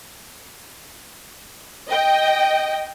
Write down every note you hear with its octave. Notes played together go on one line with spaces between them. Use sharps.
D#5 G5